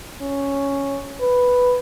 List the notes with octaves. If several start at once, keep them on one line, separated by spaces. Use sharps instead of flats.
C#4
B4